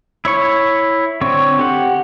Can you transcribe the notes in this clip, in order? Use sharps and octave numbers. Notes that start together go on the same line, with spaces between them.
E4 C#5 C#6
D3 C4 C#5
G4 F#5